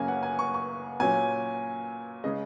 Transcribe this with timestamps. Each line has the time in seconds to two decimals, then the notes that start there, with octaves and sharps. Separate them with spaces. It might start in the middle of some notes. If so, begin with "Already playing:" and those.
Already playing: F#2 C#3 A#3 C#4 G#5
0.08 F#5
0.23 G#5
0.39 C#6
0.54 C#6
1.00 A#2 F#3 C#4 G#5
2.24 C#3 G#3 D#5